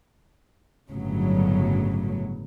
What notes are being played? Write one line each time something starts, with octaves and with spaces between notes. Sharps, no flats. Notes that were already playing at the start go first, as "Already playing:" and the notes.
G1 A2 C#3 F#3